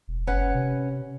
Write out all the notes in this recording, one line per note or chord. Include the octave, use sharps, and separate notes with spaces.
E1
F#1 C#4 B4 F#5
C3